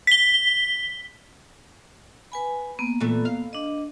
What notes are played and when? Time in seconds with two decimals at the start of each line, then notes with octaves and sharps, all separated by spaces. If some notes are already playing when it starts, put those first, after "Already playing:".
0.07 B6 G7
2.32 B4 G#5 B5
2.79 A#3 B3
3.00 A#2 E3 A3
3.25 F5
3.53 D4 D#5